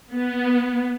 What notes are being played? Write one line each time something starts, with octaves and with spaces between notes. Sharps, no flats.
B3